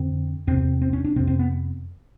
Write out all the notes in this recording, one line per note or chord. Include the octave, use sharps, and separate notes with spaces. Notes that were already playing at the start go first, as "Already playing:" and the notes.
Already playing: F2 D3 C4
E2 C3 C4
C4
C#4
D4
F2 C3 C4
C4
B3